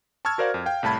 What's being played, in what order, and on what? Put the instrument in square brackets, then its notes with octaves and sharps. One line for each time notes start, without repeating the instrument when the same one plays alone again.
[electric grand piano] A5 C#6 E6 F6 G#6
F#4 A#4 C5 D5 F5
F2
F5 G5
C2 A2 A5 B5 G#6